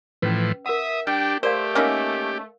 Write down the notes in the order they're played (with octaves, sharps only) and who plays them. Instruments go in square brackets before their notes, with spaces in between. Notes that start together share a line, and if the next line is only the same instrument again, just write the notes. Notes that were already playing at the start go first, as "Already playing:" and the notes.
[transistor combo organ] A2 E3 F3 [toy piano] C#4 B4
[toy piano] A#4 F#5 [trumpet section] E5 [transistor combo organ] D#6
[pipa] G3 [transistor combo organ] D4 G4 [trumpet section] G5
[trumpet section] A3 [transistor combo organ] G4 [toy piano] A#4 D5 F5 [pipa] C5
[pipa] A#3 C#4 D#4 [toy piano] A#4 F5 E6